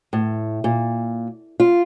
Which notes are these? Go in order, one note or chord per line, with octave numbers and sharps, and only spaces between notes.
A2
A#2
F4